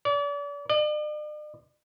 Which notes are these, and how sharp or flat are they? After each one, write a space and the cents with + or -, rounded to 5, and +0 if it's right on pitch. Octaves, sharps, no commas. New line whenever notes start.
D5 -40
D5 +45